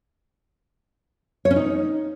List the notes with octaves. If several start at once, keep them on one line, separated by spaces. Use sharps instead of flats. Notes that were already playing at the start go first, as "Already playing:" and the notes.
C#5
C#4
D#4